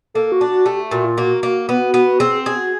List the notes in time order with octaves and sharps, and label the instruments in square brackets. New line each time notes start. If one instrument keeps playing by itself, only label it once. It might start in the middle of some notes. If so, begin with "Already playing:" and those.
[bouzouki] A#3 [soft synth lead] A4
[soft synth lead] F#4
[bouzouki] D4
[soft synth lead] F#4
[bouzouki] A3 [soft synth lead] G4
[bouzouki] A#2 [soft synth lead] F#4
[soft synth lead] F4
[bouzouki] A#3 [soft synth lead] F#4
[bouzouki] A#3
B3
B3
[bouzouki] C4 [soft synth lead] G#4
[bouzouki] G#4
[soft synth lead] F#4